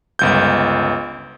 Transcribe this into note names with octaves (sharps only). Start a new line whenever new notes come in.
G1 C#2 G6